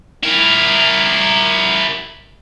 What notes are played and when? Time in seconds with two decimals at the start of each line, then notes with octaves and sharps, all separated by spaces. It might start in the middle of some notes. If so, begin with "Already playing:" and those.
0.23 E4 A#4